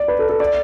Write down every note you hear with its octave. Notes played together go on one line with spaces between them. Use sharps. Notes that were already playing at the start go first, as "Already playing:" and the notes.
Already playing: D5
B4
A4
A4
D5